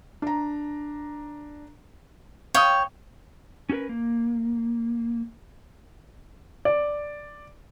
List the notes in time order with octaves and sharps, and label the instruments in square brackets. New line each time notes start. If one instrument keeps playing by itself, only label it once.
[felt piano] D4 A#5
[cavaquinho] C#5 G5 [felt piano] F5 D#6
[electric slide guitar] C#4 E4 F#4 A#4 B4
A#3
[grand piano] D5